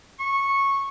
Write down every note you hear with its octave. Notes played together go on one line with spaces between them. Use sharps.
C#6